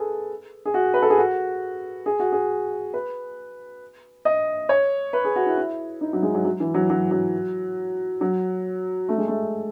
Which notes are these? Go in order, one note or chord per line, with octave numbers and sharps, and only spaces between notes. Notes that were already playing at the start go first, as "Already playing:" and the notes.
Already playing: G#4 A4 B4
G#4
F#4
B4
A4
G#4
F#4
G#4
F#4
G#4
B4
D#5
C#5
B4
G#4
F#4
E4
E4
D#4
F#3
G#3
F#3
F#3
E3
F#3
F#3
F#3
F#3
A3
G#3
A3